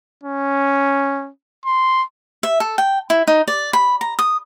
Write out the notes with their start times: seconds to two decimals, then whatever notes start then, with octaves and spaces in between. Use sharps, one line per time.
0.23 C#4
1.65 C6
2.43 E5
2.60 A4
2.78 G5
3.10 E4
3.28 D#4
3.48 D5
3.73 B5
4.01 A#5
4.19 D#6